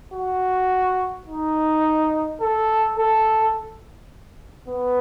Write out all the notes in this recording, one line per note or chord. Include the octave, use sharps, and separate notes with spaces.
F#4
D#4
A4
A4
B3